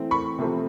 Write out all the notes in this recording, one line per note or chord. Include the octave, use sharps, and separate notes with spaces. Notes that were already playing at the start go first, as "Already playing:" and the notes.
Already playing: E3 A3 C4
B5 C#6
C3 F3 A3 C4